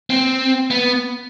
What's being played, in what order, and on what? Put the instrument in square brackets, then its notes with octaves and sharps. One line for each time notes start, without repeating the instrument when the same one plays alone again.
[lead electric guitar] C4
B3